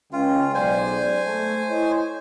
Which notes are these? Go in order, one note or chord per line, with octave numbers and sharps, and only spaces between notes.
C#2 C#4 F4 G5
B1 G#3 C5 D5 G#5
A3
E4 C#5 D#5